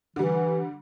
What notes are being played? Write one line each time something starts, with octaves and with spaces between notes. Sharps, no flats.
D3 E3 G3